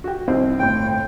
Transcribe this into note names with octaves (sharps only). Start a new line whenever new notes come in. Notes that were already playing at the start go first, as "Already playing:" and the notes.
F#4 G4
C2 C4 D#4
G1 A2 G5